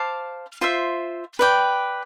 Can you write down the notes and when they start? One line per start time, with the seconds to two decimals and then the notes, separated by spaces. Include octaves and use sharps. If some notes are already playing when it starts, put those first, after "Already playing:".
Already playing: C5 F5 A5 D6
0.61 F4 C5 E5
1.39 B4 D5 G5